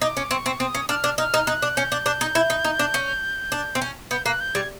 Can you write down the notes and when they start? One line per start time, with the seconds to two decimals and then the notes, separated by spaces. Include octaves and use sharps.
0.01 D#4 D6
0.17 C#4
0.31 C4 C#6
0.46 C4
0.59 C4 D#6
0.75 C#4
0.89 D4 F6
1.04 D4
1.18 D#4 F6
1.34 D#4
1.47 D#4 F#6
1.62 D4
1.76 C#4 G6
1.92 D4
2.06 D4
2.21 D#4
2.35 E4
2.50 D#4
2.64 D#4
2.79 D4
2.94 C#4
3.52 D4
3.75 C4
3.82 C#4
4.11 B3 G6
4.26 A#3 F#6
4.41 G6
4.54 G3 G#6